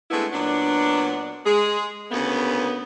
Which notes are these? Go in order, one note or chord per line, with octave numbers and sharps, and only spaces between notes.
G#3 A3 B3 C4 D4 E4
A#2 F#3 B3 D4
G#3 G#4
D2 C#3 A#3 B3